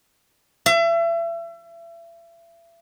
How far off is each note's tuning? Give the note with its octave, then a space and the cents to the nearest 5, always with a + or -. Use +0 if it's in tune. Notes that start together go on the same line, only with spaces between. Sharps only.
E5 +35